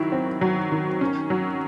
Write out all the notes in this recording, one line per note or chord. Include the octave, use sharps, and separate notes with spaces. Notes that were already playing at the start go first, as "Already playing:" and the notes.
Already playing: D#3 F#3 E4
C4
F#3
D#3
C#4
F#3